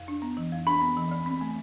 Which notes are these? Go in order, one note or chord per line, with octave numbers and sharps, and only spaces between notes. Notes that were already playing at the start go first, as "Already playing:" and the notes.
Already playing: F2
D4
B3
E3
F2
D4 B5
B3
E3
D2
C4
A3